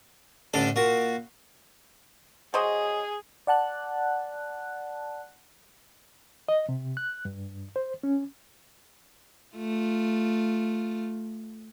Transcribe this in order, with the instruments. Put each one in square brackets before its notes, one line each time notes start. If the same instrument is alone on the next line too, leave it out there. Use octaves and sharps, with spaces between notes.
[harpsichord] A1 D3 D4 A4
A#2 F#4
[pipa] F#3 C5 D#5 [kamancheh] G#4
[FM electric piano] D5 F#5 A5 F#6
[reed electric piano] D#5
C3
F#6
G2
C5
C#4
[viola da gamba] A3 F4